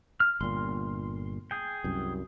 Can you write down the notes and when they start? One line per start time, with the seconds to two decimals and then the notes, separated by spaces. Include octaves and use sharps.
0.20 F6
0.41 G1 A#2 C6
1.51 G#4 G5
1.84 C2 F#2